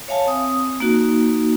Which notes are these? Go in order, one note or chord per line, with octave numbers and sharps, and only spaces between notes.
C#5 E5 F5 G#5 A5
C4 D#6
A#3 D#4 F#4